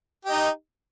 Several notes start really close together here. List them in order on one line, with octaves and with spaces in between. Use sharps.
G4 D#5 D#4